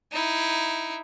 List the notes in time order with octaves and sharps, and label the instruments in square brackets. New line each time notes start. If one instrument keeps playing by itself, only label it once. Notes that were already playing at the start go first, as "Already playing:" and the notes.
[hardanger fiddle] D#4 E4